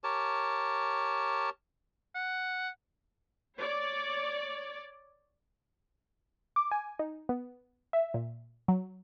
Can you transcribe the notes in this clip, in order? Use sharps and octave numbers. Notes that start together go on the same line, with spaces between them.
G4 A#4 C#5 A5
F#5
C#5 D5
D6
G#5
D#4
B3
E5
A#2
F#3